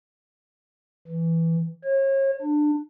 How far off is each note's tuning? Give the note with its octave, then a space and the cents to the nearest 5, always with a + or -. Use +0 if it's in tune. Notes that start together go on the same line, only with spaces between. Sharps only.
E3 +0
C#5 -35
D4 +20